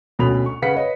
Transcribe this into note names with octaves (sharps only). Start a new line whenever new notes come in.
D2 B2 C#4 B5 F7
C#6
C#3 B4 F#5 B6 C#7
B4 C#5 D#5